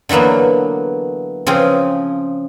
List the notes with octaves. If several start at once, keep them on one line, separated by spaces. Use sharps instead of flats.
D3 E3 F#3 A#3 B3
C#3 F3 C4 G#4